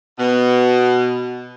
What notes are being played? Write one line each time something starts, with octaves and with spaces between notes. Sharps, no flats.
B2